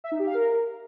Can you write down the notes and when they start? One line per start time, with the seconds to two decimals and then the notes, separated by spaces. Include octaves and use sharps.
0.04 E5
0.12 D#4
0.19 G4
0.27 F5
0.35 A#4